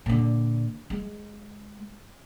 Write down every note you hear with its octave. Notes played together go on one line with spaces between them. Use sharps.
A#2 D3
G#3